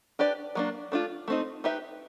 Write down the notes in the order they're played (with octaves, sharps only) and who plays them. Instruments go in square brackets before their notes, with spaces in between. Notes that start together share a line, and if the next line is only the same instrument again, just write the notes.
[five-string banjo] D4 G4 B4 D5
F#3 A#3 D4
A3 D4 F4
A3 C4 D#4
D#4 G4 B4 E5